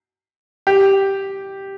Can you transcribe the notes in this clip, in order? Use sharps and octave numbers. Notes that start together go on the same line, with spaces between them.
G4